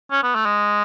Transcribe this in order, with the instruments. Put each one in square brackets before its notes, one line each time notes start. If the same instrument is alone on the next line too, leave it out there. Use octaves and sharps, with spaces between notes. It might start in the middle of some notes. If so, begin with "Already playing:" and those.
[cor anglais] C#4
B3
A3
G#3